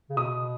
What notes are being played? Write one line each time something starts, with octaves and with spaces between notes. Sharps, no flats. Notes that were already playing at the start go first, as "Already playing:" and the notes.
C#3
B2 D#6